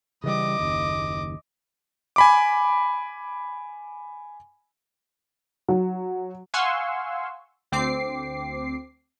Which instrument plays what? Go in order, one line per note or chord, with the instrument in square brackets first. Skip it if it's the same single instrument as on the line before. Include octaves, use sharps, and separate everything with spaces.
[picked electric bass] C#3 E3 G3 [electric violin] D#5 D6
[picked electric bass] F#1 D#2
[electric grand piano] G#5 B5 D6
[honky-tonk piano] F#3
[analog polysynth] F5 F#5 G#5 C6 C#6 E6
D2 C4 D6 C7